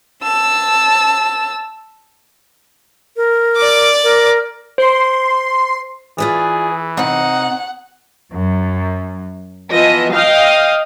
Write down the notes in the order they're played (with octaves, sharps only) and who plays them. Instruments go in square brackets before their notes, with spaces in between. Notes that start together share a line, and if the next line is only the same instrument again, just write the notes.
[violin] A5 E6
[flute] A#4
[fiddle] D5 D6
[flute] A#4
[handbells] C5 [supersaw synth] C6
[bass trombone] E3 [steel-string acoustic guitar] F4 B4 D5 [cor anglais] G#4
[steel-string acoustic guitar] C3 C4 [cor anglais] D#4 [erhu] F#5
[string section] F#2
E3 F3 B3 D#5 E5
D#5 F5 G5 D#6 F6